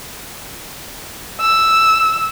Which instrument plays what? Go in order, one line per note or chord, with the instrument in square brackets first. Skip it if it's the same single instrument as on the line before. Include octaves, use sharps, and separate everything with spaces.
[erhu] E6